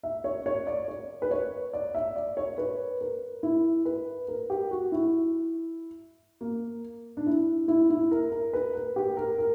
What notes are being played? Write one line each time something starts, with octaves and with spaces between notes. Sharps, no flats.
E5
C#5
C#5
D5
C#5
B4
C#5
D5
E5
D5
C#5
B4
A#4
E4
B4
A#4
G4
F#4
E4
A#3
D4
E4
E4
E4
A#4
A#4
B4
A#4
G4
A#4
A#4